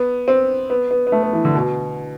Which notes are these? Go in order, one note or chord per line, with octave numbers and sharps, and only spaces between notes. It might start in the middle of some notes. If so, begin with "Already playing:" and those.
Already playing: B3
C4
B3
B3
B3
A3
B3
E3
D3
B2